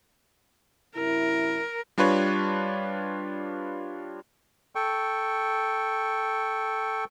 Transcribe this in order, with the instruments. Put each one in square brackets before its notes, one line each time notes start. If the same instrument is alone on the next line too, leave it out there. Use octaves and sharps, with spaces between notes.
[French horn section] F#2 C3 E4 [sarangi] A#4
[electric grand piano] G3 D4 F4 B4 C#5
[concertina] A4 G5 C#6